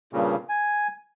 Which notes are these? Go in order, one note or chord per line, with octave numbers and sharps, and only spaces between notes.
G2 A#2 C#3
G#5